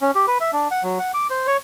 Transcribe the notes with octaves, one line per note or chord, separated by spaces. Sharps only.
C#4
G4
B4
E5
D4
F#5
F#3
F#5
D6
C5
C#5